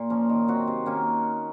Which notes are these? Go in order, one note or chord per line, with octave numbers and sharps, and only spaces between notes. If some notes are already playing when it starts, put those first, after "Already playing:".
Already playing: A#2
F3 A#3 C#4
D#3
F#3 C4 F#4
C3
D#3 A#3 C#4